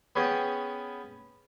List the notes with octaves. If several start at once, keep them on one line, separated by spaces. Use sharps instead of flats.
B3 C#4 G#4 C#5 G5